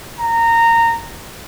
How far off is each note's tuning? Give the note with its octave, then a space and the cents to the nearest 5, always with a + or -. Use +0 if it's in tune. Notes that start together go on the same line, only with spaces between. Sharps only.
A#5 -20